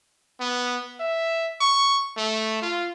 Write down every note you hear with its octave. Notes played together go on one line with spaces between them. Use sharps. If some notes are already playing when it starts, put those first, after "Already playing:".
B3
E5
C#6
A3
F4